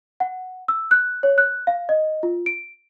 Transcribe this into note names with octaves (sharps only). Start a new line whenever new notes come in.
F#5
E6
F#6
C#5
F#6
F5
D#5
F4
D7